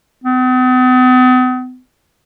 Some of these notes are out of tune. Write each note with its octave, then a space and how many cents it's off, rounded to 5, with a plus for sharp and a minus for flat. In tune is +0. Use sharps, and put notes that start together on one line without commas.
B3 +45